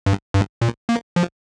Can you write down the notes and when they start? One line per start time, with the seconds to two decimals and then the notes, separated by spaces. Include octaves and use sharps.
0.06 G2
0.34 G2
0.62 A#2
0.89 A#3
1.16 F3